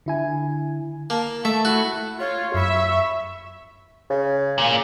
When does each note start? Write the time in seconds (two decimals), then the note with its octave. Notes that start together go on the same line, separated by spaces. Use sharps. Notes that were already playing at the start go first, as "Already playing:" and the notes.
0.06 D3 E4 G#5
1.10 A#3 A5
1.45 A3 E5
1.65 E4 F#4
2.20 F4 C#5
2.54 F#2 E5 B5 C#6
4.10 C#3
4.58 A#2